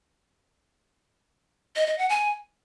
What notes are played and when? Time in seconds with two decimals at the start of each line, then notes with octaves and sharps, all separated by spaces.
1.76 D#5
1.87 D#5
1.98 F#5
2.09 G#5